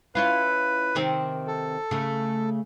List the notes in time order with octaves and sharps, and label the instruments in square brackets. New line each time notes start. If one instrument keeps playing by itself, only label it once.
[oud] C#4 E4 F4 [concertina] B4
[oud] C3 D#3 C4
[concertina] A4
[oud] C#3 A3